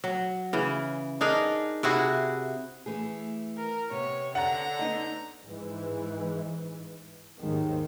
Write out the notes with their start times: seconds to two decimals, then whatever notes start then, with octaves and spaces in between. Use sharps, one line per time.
0.04 F#3
0.53 C#3 E3
1.21 D4 D#4 G#4 A#4
1.83 C3 E4 F#4 G#4
2.86 E3 A3 G#4
3.58 A#4
3.91 C3 B3 C#5
4.35 D3 F#5 A#5
4.79 B3 D#4 D#5
5.44 G#2 E3
7.39 D#2 G#2 D#3 G#3